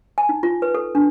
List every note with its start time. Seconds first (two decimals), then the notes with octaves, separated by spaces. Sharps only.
0.18 G#5
0.29 D#4
0.43 F4
0.62 B4
0.75 A4
0.95 D4